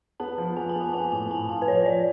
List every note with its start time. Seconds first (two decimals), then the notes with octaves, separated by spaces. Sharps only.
0.20 B3 A5
0.38 F3
0.57 B3 G#5
0.69 A5
0.75 B3
0.81 G#5
0.94 B3 G#5
1.12 A2 G#5
1.31 A2 A5
1.49 F4 G#5
1.62 B4
1.68 F3 C#5
1.86 F3 D5